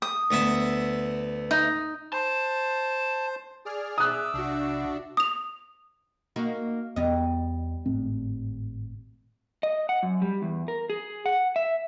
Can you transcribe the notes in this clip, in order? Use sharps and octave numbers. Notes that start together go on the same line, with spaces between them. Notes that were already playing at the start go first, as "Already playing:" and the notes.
D#6
D2 B3 E5
D#4
C5 A5
G#4 D5 F6
E5 D6 D#6 F#6
B1 C3 D4 F#4
D#6 F7
A#3 D#4 F#4
E2 G3 B3 D#5
G#1 A2 C4
D#5
F#5
F#2
G3
E2
A#4
G#4
F#5
E5